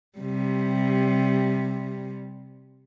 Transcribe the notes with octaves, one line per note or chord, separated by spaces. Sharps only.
C3 G3